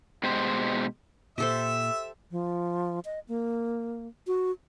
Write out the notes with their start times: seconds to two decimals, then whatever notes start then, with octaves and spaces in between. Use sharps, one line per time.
0.23 B2 G#3 G4 C5
1.38 A#2 G4 A4 C5 E5 E6
2.31 F3
3.05 D#5
3.28 A#3
4.27 F#4